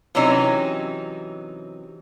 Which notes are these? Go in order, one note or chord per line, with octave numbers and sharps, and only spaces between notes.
C3 E3 F#3 C#4 D#4